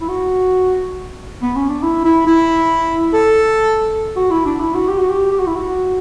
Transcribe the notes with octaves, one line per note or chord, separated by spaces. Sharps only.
E4
F#4
B3
C#4
D4
E4
E4
E4
A4
F#4
E4
D4
E4
F#4
G4
F#4
G4
G4
F#4
E4
F#4